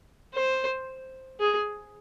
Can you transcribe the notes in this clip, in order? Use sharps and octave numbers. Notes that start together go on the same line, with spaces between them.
C5
G#4